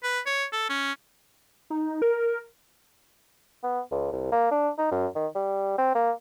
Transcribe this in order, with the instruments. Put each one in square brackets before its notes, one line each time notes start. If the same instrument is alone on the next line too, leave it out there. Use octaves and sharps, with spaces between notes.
[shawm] B4
C#5
A4
C#4
[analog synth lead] D#4
A#4
[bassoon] B3
C#2
C2
A#3
D4
D#4
F#2
D#3
G3
C4
A#3